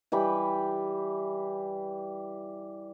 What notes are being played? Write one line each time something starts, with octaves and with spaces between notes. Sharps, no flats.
E3 G3 G5 B5